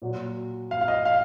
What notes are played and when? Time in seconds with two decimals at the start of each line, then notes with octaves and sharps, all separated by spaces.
0.02 A#2 F#3
0.71 F5
0.81 F5
0.88 D#5
1.05 F5